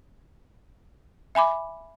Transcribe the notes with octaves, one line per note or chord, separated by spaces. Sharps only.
E5 G#5 B5 D6